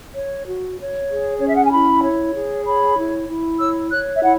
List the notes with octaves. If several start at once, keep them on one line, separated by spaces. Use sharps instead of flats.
C#5
F#4
C#5
G#4
C#4 C#5
E5
F#5
G#5
E4 B5
C#5
G#4
C#5 B5
E4
E4
C#5 E6
C#5 F#6
E5
E4 F#5